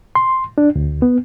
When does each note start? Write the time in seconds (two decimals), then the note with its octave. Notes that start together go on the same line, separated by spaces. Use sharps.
0.15 C6
0.58 D4
0.76 D2
1.02 B3